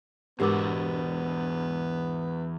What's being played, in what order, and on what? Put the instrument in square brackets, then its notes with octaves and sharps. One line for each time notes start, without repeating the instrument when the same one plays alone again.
[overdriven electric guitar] E2 F#4 [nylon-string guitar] G#2 D4 [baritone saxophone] B3 [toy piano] G4 A#4 D6